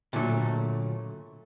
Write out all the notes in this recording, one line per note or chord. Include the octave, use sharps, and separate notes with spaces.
A#2 D3 F#3 A3